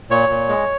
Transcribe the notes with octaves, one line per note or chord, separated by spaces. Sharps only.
A#2 C#5
A#2
G#3